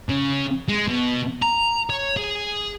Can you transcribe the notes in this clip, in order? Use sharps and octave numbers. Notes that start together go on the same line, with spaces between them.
C#3
G#3
B2
A#5
C#5
G#4